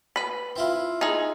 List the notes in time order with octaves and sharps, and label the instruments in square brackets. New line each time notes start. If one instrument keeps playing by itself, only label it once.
[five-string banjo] B4 B5
[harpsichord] C4 E4 F4
[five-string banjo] D#4 G#4